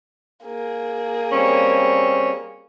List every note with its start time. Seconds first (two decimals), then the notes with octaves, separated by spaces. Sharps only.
0.44 A#3 G#4
1.32 G3 C4 C#4